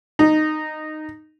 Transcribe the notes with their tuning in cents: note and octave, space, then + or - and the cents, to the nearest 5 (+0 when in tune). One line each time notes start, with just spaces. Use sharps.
D#4 -10